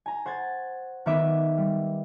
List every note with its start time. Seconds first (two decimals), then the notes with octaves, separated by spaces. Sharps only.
0.06 G#5 A#5
0.26 C5 F#5 G#6 A6
1.06 D#3 B3 A#4 B4 E5 D6
1.58 G3